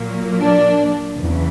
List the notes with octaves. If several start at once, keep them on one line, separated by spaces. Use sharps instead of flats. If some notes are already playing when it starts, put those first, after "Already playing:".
Already playing: A#2 F#3 A#3
D4
E2 C#3 E3